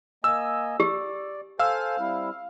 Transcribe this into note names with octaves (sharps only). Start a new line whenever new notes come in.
A#3 D#5 G#5 E6
G4 D5
A4 C5 F5 G#5 E6
G3 C4 E4